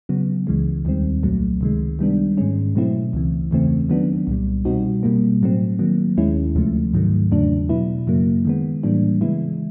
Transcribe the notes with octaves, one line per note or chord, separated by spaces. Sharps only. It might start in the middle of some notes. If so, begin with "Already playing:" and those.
C#3 F#3 B3
C#2 C#3 E3 G#3
D#2 D#3 G3 C4
C2 A#2 F#3 A3
C#2 C3 D#3 G#3
D#3 G3 B3 D4
G#2 D#3 G#3 C#4
B2 F#3 A3 C4 E4
C#2 C#3 E3
E2 C#3 E3 A3 C4
D#3 F#3 B3 D4
C2 A#2 G3
B2 G3 C4 D#4 F#4
B2 G3 A#3
A2 F#3 A3 C4
D#3 F#3 A#3
D#2 D#3 G#3 C#4 E4
D2 C3 F3 A3
G#2 D#3 F#3 A3
E2 C#3 F#3 A3 D4
B2 F#3 B3 E4
F#2 C#3 F#3 A#3
D#3 G#3 B3
A2 E3 G3 A#3 D4
C#3 E3 G#3 B3 E4